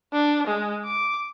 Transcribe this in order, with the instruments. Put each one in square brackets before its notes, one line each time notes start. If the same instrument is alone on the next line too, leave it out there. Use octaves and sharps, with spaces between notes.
[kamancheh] D4
G#3
D6